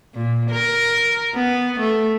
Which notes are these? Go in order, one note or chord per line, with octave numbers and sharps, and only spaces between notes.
A#2
A#4
B3
A3